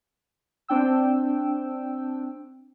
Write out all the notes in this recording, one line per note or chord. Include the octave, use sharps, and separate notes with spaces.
C4 D4 G5 E6